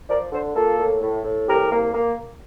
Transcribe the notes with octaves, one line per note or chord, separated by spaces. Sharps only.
F3 A#4 D5
D3 A4 C5
A#3 F4 A4
A2
A2
A2
C2 G4 A#4
A#3
A#3